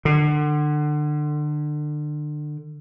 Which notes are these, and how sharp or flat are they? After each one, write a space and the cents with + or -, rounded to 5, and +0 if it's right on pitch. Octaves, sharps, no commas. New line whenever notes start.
D3 +30